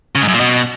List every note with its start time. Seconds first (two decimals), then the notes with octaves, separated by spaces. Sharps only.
0.15 C#3
0.22 G#2
0.28 F#2
0.34 A#2
0.40 B2